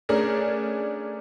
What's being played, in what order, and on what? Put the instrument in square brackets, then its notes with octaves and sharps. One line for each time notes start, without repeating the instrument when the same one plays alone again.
[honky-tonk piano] A3 C#4 D4 G#4 A#4